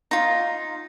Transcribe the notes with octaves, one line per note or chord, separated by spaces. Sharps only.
D#4 F4